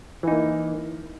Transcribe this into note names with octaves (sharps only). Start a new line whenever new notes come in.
E3 A#3 D#4